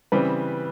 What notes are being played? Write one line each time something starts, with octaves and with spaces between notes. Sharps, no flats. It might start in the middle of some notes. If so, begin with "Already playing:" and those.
C#3 E3 G3 C4 B4